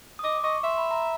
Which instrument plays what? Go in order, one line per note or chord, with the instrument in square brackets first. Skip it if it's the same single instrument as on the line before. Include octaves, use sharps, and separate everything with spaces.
[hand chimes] D#6
[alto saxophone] D#5 [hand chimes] D6
[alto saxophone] D#5 [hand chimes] C#6
[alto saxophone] E5 [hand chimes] C6
[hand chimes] B5
A#5